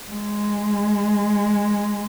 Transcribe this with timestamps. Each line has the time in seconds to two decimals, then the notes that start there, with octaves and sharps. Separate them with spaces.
0.11 G#3